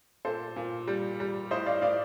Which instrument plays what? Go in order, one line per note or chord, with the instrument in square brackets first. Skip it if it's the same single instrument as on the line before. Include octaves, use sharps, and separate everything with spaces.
[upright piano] A#2 A4 C5
A#2
G3
G3
A2 C5 D#5
D5 F5
A2 D5 F5